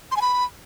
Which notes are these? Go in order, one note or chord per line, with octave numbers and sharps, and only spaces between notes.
C6
G#5
B5